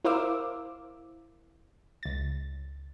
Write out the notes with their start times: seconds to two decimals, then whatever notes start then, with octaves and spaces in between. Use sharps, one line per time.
0.05 E4 A#4 C5 F5 D6 E6
2.03 C#2 A6